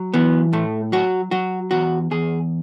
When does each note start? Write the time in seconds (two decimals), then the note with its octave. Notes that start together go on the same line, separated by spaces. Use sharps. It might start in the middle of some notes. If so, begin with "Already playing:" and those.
Already playing: F#3
0.14 E3 B3
0.53 A2 A3
0.92 F#3 F#4
1.31 F#3 F#4
1.71 E2 F#4
2.11 E2 G#4